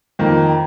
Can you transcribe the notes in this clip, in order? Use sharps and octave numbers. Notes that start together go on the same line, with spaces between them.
F2 D#3 A#3